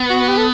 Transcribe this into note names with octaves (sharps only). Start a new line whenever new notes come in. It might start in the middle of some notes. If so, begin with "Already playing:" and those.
Already playing: B3
F#4
G4
A4